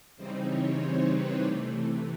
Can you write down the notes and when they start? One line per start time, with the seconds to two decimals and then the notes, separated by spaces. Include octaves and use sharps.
0.16 C#3 E3 G3 C4 D#4 C5
0.47 C#5
0.76 C5
1.07 B4
1.37 C3 E3 A3 D5